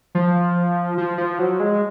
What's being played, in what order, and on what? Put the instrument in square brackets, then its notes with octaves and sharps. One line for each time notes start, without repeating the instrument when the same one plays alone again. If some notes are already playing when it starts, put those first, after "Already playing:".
[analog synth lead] F3
F3
F3
F#3
G#3